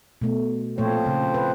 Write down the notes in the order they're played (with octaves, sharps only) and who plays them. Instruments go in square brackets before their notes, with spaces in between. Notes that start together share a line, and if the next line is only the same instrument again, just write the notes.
[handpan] B2 A3
[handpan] A#2 A3 C#5 [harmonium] F3 C4 C5
[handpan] C#3
B4